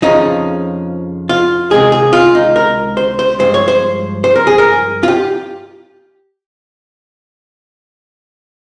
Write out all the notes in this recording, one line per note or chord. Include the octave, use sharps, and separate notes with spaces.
F2 C#3 F3 D#4
F4
C#2 C3 D#3 G#3 G#4
G#4
F4
D#4
A#4
C5
C5
G2 F3 G#3 C5
C#5
C5
C5
A#4
G#4
A#4
F4
G4